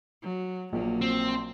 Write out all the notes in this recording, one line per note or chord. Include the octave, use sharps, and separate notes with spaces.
F#3
A#1 F#3 A#3
C4